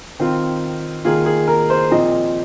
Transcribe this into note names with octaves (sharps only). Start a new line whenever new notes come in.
D#3 C4 F4
D#3 A#3 F4 G#4
G#4
A#4
C5
A#2 F3 C4 D#5